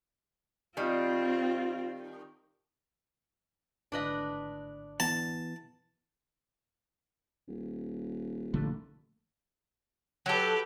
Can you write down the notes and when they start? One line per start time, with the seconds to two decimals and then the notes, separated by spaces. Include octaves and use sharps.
0.77 D#3 G3 C4 F4
3.92 G#1 A2 D3 D4 B4 D#5
5.00 E3 B3 A5
7.48 D#1
8.54 A#1 D3 A3
10.26 F#3 G4 A4 B4